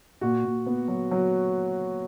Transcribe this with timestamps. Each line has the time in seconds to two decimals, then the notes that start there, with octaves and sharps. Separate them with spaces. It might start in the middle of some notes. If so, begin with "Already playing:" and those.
0.21 A#2 F#4
0.44 A#2
0.66 B3
0.88 F#3
1.11 F#3